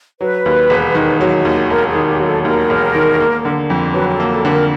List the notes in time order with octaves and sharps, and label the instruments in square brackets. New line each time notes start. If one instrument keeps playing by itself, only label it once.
[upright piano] F#3 [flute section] B4
[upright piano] D#2
E1
D#3
F#3
D#2
[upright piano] E1 [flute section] A#4
[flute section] G#4
[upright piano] D#3
[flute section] G4
[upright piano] F#3
[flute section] A4
[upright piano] D#2 [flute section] A#4
[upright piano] E1
D#3
A#3
D3
F2
[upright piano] F#3 [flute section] B4
[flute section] A#4
A4
[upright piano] A#3
[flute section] A4
[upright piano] D3 [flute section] B4
[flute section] A#4